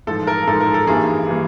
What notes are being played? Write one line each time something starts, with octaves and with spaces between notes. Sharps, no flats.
A1 G#2 F3 A4
A#4
A1 G#2 F3 A4
A#4
A4
G#1 G2 E3 G3 A#3 G#4
E3 G3 A#3